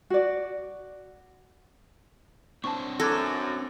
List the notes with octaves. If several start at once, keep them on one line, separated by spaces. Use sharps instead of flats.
F#4 D5
C4 D4 C5 A5 C#6
F#2 A4 D6 G#6 A#6